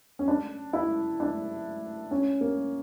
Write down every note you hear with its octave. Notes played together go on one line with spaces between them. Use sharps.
C#4
D4
E4
D4
C#4
A#3